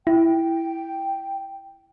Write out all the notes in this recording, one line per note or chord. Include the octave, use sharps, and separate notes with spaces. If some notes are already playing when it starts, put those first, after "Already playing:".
E4 G5